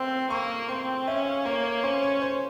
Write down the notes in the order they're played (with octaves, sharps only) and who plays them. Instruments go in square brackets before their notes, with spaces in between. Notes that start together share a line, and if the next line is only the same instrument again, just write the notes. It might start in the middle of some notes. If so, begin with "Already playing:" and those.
Already playing: [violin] C4 [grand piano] E6
[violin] A#3 [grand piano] C#6
[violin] C4 [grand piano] C6
[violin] C#4 [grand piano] E5
[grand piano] F5
[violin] A#3 [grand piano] C#5
[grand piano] C#5
[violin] C#4 [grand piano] C5
[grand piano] C#5
C#5
C5